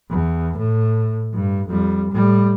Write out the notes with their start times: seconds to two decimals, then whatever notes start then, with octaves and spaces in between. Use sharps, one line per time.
0.10 E2
0.58 A2
1.33 G2
1.68 F2 G3
2.11 A2 G3